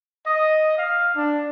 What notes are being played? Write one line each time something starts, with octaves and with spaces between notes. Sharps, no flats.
D#5
F5
D4